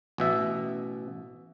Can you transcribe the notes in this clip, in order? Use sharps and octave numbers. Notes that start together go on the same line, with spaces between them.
A1 B2 E5